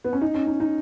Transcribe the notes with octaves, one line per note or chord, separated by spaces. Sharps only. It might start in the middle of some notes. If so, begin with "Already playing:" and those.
B3
C#4
D#4
C#4
D#4
D#4